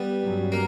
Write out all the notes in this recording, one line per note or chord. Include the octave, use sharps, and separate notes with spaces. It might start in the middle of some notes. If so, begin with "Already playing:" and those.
Already playing: G3 B3
G2 F#3 C#4
A#3